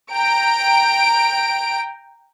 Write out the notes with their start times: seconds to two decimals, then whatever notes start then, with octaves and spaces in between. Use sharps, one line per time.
0.11 G5 A#5 D7